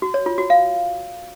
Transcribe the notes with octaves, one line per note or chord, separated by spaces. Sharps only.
F#4
C#5
F4
F#4
F5